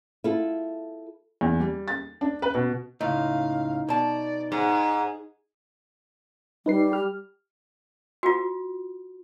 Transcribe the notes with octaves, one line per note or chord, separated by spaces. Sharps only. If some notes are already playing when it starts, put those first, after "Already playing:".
E4 F4 A4
E2
G3
A6
D4
B4
B2
C#2 A2 D#4 F5
B2 D5 A5
G#2 G#4
G3 D#4 B4 C7
G4 F6
F4 F#4